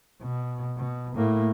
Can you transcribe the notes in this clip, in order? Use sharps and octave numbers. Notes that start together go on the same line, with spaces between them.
B2
B2
A2 A#3